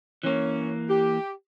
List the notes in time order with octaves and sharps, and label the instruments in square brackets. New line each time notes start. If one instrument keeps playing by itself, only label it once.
[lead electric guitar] E3 A#3 [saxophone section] C#4
[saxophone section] G4